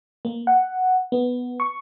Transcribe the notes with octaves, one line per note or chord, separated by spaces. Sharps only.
A#3
F#5
B3
C#6